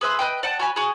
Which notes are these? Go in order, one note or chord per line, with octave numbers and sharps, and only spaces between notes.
G#4 B4 E5 C6
B4 D#5 G5
D5 F#5 G5 A5
F#4 C#5 G#5 B5
F#4 G#4